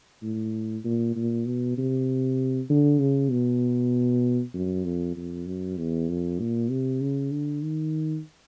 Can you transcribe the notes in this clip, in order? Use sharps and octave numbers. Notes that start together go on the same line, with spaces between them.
A2
A#2
A#2
B2
C3
D3
C#3
B2
F#2
F2
F2
F#2
E2
F2
A#2
C3
C#3
D3
D#3